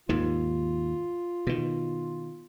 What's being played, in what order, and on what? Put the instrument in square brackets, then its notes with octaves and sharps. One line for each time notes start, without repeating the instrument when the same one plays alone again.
[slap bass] D#2 G#2 D#3 [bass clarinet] F4
[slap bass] B2 D#3